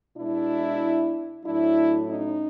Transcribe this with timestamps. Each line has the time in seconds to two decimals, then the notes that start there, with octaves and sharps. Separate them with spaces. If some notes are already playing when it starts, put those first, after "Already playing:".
0.17 B2 G#3 D4 E4
1.44 A2 F#3 D4 E4
2.08 C#4 D#4